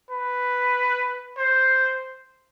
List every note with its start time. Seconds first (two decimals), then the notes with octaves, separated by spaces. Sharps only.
0.10 B4
1.38 C5